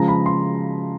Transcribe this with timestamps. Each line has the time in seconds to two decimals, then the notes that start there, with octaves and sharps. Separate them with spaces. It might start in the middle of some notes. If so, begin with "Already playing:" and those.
Already playing: C#3 F3 G#3 A#5
0.08 B5
0.26 C6